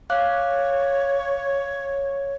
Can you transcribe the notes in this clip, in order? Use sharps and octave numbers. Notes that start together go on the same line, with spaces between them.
C#5 F5 D6 F#6